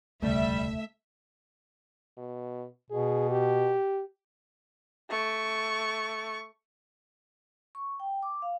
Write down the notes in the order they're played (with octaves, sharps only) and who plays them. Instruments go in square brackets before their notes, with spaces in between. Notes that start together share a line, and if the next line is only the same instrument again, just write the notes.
[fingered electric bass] E1 D2 C#3 [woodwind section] G3 [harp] A3 [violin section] E5
[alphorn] B2
[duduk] B2 [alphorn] G#4
[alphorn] G4
[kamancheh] A3 C#6
[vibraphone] C#6
G5
D6
F5